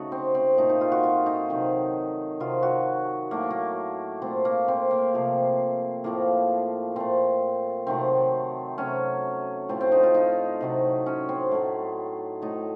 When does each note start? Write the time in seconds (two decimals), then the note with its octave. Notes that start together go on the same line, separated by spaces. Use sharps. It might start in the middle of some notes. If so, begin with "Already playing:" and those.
Already playing: C#3 A3 D#4 F#4 A4
0.12 C4
0.35 C4
0.57 A#2 A3 D#4
0.69 D#4
0.81 F4
0.92 F#4
1.03 F4
1.26 D#4
1.49 C3 D#3 F#3
2.40 C3 D#3 F#3 F4
2.63 F#4
3.31 A2 F#3 A3 A#3
3.51 A#3
4.22 A#2 A3 C4
4.45 A#3
4.68 C4
4.91 A#3
5.14 C3 F3 A3
6.04 A2 F3 A3 A#3
6.96 A#2 A3 C4
7.87 C3 D#3 F#3 A3 C4
8.78 C3 F#3 A3 C#4
9.69 A2 F3 A3 C4
9.81 C4
9.92 D#4
10.03 F4
10.15 D#4
10.61 C3 F#3 A3
11.06 C#4
11.29 C4
11.51 A2 F#3 A3
12.42 A2 A3 D#4